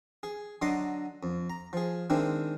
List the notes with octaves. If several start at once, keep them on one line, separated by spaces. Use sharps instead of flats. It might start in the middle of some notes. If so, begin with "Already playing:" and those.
G#4
D3 F#3 D#5 C6 D6 D#6
F2
A#5
F3 G#4
D#3 G#3 C4 D4 E4